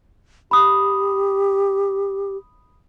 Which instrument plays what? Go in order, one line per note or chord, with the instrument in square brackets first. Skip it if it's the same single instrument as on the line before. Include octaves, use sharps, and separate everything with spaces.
[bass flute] G4 [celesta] B5 D#6